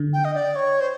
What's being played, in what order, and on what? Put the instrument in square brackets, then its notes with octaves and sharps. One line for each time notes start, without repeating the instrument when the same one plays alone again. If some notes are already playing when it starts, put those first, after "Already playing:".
Already playing: [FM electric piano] D3
[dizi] G5
D#5
D5
C#5
C5